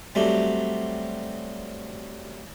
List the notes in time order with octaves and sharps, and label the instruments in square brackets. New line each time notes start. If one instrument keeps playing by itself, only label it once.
[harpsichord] F#3 G3 A3 C4